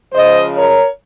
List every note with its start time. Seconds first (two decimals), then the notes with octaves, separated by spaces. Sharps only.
0.13 C#3 F3 G#3 C5 D#5
0.56 A#4 C#5